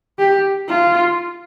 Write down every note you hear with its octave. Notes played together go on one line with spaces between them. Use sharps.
G4
F4